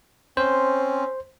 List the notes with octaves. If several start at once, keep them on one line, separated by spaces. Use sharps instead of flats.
C4 C#4 C5